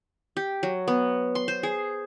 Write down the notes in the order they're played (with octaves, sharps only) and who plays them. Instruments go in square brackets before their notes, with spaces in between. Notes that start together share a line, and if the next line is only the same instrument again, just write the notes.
[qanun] G4
F#3
B3
C6
C5
G#4